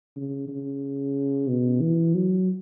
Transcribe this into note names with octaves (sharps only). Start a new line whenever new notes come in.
C#3
C#3
B2
E3
F#3